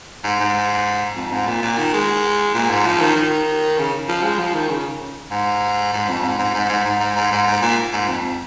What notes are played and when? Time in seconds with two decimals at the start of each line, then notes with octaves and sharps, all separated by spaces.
0.24 G#2
0.40 G#2
1.16 F2
1.32 G#2
1.48 A#2
1.63 A#2
1.78 D#3
1.94 G#3
2.54 A#2
2.70 G#2
2.86 F3
3.01 D#3
3.16 D#3
3.78 C#3
4.09 F3
4.23 G#3
4.39 F3
4.55 D#3
4.70 C#3
5.31 G#2
5.93 G#2
6.09 F2
6.24 G#2
6.39 G#2
6.54 G#2
6.69 G#2
6.85 G#2
7.00 G#2
7.16 G#2
7.32 G#2
7.47 G#2
7.62 A#2
7.93 G#2
8.09 F2